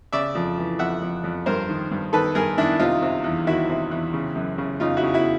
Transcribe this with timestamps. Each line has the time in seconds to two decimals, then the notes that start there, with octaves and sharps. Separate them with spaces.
0.13 C#3 D5 E5
0.35 F2
0.58 E3
0.79 F2 E5 F#5
1.02 F2
1.24 F2
1.46 G2 A#4 C5
1.69 D#3
1.91 G2
2.13 D#3 A4 B4
2.35 G2 G#4 A#4
2.58 D#3 D4 E4
2.80 C3 D#4 F4
3.03 C3
3.24 E2
3.47 D#3 E4 F#4
3.69 C3
3.92 E2
4.14 C#3
4.35 F#2
4.58 C#3
4.80 C#3 D#4 F4
4.97 E4 F#4
5.03 C#3
5.14 E4 F#4